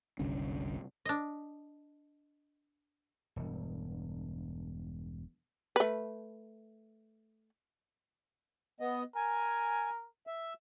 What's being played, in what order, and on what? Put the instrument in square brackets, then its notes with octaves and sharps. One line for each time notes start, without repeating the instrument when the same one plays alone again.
[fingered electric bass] F#1 C2 D3 C#4
[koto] D4 D#5
[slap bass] E1 G2
[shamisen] A3 B4
[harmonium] B3 D#5
[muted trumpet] A#4 [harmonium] G#5
[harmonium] E5